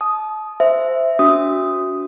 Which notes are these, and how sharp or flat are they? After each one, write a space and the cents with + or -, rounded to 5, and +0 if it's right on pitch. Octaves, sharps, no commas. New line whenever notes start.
A5 -35 D#6 +0
C5 -10 E5 +0
D4 -35 F#4 +0 D#6 +0